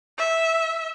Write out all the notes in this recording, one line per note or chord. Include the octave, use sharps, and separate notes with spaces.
E5